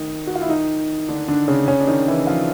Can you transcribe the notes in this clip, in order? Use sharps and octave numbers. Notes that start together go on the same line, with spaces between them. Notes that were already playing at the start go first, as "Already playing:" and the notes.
Already playing: D#3 D#4
F#4
F4
E4
D#3 D#4
D3 D4
D3 D4
C#3 C#4
C#3 C#4
D4
D#3 D#4
E3 E4
F3 F4